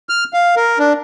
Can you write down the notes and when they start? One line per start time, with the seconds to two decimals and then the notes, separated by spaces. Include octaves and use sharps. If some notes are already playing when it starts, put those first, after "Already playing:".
0.09 F6
0.34 F5
0.56 A#4
0.79 D4